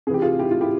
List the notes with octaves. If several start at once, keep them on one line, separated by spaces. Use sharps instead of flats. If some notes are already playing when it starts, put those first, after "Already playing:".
C3 E3 G4 G#4
F4 G#4
E4 G4
F4
E4 G4